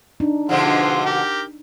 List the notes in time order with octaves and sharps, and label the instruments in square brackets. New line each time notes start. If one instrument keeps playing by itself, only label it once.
[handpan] D4 D#4
[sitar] B2 D3 F3 [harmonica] G#3 C4 F4 [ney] F#5
[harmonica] G4 A#4